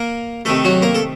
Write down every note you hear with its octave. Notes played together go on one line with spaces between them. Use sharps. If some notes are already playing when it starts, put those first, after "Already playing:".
Already playing: A#3 A#4
C3 D#3 A3 A4
F#3 F#4
A#3 A#4
A4